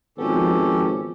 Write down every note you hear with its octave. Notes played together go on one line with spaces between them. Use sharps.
G#1 F3 B3 C#4 G4 A4